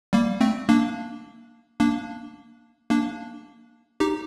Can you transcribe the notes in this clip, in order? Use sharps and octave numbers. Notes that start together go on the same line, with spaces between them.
G3 A#3
A3 C4
A#3 D4
A#3 D4
A#3 D4
D#4 G4